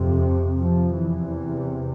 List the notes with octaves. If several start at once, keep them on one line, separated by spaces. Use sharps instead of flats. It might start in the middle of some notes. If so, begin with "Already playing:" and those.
Already playing: F2 C3
F3
E2 C3 E3